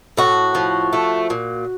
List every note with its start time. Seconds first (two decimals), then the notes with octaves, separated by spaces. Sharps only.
0.17 A2 F#4
0.55 F3
0.93 A3
1.30 A#2